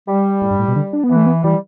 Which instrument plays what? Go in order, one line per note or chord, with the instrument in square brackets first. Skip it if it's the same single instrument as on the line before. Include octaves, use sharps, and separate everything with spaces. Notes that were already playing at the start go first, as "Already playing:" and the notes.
[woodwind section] G3
[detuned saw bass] A2
G2
A2
B2
D3
D4
B3
[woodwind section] E3
[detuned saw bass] A3
B3
[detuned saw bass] E3 [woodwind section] G3